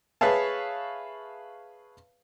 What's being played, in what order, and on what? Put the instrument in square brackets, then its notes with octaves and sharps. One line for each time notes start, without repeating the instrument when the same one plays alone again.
[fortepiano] G#4 B4 C#5 E5 F5 A5